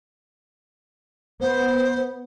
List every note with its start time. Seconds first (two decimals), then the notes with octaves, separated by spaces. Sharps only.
1.41 B3 C5